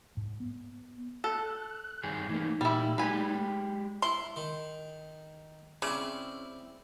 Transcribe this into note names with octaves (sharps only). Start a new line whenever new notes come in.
G#2
B3
A4 F#6
G2 D#3 G#4
E3 A3 A#3 D#4
A#2 G3 E4
G#3 G4 B4 G#5
E4 C6
D#3
C#3 C4 E4 D5